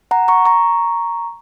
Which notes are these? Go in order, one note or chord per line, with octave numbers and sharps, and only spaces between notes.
F#5 A#5
A#5 C#6
A#5 C#6